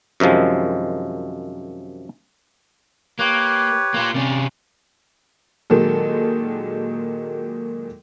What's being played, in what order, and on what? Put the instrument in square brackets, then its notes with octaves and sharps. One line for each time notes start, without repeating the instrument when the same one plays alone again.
[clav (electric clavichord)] F#2 C3 D#3 F3 G#3
[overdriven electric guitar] A#3 [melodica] G4 B4 C#5
[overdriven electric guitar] A#3 F4
[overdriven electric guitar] C3 C#4 [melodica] D5
[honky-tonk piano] A#2 D#3 F#3 G#3 A4